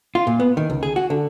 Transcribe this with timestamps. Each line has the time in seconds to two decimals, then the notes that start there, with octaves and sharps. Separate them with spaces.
0.15 F4
0.27 A#2
0.40 B3
0.57 D#3
0.70 C#2
0.83 G#4
0.96 F#4
1.10 D3